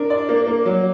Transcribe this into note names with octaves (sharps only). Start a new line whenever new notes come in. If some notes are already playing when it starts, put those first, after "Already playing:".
Already playing: D4 A#4
D5
A#3
A#3
F#3